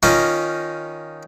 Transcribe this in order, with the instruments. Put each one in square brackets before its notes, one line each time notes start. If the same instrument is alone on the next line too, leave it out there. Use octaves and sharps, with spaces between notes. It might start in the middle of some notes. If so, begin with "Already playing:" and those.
[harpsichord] D#3 C#4 D#4 F4